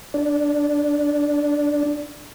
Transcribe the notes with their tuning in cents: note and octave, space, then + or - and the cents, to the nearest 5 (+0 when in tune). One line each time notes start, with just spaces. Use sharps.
D4 +0 D5 +0